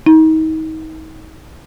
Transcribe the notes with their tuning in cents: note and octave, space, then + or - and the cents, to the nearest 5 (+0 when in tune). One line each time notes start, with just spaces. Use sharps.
D#4 +30